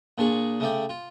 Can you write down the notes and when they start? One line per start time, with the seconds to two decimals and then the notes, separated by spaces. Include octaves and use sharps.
0.18 A#2 D4 G#4 C#6
0.60 C#3 A3 D5 G5
0.89 F4